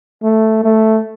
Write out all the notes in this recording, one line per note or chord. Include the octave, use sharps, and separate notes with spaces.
A3
A3